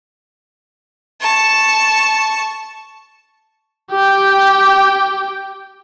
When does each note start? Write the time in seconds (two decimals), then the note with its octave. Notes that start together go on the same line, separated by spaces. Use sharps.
1.21 A5 C#6
3.91 G4 G5